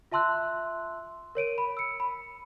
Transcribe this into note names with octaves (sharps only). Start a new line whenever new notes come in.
F4 E5 A5 C6 E6 F#6
A#4 C#5 D7 D#7
B5
E6 C#7
B5